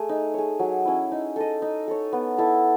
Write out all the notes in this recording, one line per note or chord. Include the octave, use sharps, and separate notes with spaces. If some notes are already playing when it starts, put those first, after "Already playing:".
Already playing: A3 G#4 D#5
D#4
G#4 C#5
F#3
C#4 E4
D#4
A4 D#5
D#4
A4 C#5
B3
E4 A4